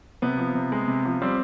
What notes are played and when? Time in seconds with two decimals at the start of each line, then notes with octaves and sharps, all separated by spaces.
0.22 C3 B3
0.38 F3
0.55 C3
0.72 G#3
0.88 C3
1.05 F3
1.22 G3 C4